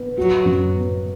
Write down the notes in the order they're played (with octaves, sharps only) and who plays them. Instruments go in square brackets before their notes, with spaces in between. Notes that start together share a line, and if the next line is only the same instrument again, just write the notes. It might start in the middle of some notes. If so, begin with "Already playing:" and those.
Already playing: [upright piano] B3
[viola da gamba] F#3 [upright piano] F#4
[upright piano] F#2
B3